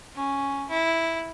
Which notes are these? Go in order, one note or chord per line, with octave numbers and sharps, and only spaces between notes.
C#4
E4